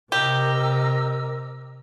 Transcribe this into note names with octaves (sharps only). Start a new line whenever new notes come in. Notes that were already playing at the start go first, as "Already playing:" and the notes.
C3 G4 A#4 D#5 E6